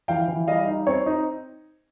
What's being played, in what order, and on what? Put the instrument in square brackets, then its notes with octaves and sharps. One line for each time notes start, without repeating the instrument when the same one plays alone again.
[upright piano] E3 F5 G5
E3
G3 D#5 F5
D#4
C4 C#5
D#4